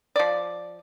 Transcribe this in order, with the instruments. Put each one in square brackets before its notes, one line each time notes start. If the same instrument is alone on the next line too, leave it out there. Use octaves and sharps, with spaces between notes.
[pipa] F3 D5